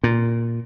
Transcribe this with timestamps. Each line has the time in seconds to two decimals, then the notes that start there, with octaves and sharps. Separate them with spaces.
0.04 A#2